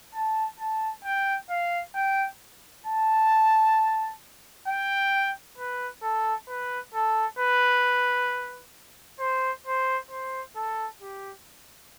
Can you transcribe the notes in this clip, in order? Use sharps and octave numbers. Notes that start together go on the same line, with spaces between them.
A5
A5
G5
F5
G5
A5
G5
B4
A4
B4
A4
B4
C5
C5
C5
A4
G4